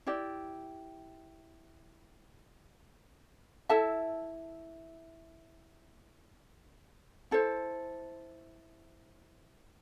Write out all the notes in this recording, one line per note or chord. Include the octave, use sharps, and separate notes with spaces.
E4 G4 D5
E4 A4 E5 A5
E4 A4 C5